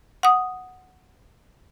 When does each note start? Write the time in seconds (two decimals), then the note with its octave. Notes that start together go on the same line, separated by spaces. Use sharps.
0.23 F#5 D#6